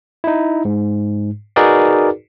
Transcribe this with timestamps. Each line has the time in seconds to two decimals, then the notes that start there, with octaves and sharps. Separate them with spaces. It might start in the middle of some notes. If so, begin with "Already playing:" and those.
0.24 D#4 E4
0.65 G#2
1.56 D#4 F#4 G#4 A#4 B4 D5